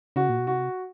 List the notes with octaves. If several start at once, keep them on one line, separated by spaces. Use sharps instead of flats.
C#3 F#4
A#2
B2
C3 F#4